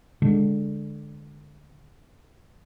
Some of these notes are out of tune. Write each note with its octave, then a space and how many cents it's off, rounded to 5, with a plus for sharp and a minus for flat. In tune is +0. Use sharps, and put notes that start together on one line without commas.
D3 +0 G#3 -5